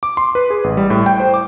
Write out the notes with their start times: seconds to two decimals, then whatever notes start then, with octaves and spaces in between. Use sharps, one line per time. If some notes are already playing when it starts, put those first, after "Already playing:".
0.03 D6
0.17 C6
0.35 B4
0.50 G#4
0.64 A1
0.77 G3
0.90 A2
1.06 G5
1.20 C5
1.34 D6